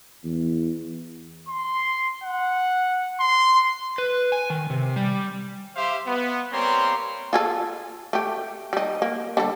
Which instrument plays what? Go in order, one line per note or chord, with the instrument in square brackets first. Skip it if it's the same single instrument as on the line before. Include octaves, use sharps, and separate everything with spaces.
[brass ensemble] E2
[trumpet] C6
F#5
C6
[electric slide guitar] B4
G#5
D#3
C3
G3
[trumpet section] G4 C5 E5 F5 C6
B3
G3 A#3 C4 C#5 A#5 C6
[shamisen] F4 G#4 A4
A3 G4
G3 D#4
A#3
D3 G3 A4